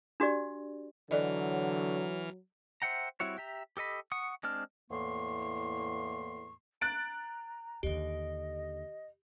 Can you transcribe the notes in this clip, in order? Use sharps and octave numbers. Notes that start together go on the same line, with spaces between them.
D4 F#4 G4 D5
D3 E3 F#3 A4 D5 D#5 F6
C5 E5 F#5 G5 A#5
G3 C4 E4 F#4 C#5
G4 E5 A#5
G4 A4 D#5 B5
F#5 C#6 D#6
G#3 C4 D4 A5 F6
E2 A2 A#3 C6 C#6
A#5 F#6 A6 D7
D#2 D3 G4 D#5